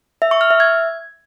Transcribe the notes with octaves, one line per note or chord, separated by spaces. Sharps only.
E5
C#6
F6
E5
G#6